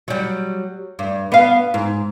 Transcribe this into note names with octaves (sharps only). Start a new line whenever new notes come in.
F#3 G3
G2
B3 F5
G#2